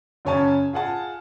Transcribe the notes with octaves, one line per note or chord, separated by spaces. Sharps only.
F#2 C#3 C#5 G#5 A5
F4 G#4 F#5 A5